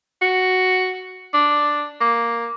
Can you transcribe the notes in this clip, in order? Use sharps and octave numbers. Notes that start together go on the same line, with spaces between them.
F#4
D4
A#3